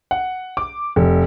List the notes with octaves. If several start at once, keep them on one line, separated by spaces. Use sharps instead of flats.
F#5
D6
F1